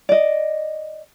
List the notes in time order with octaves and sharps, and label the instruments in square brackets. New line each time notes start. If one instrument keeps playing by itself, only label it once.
[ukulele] D5 D#5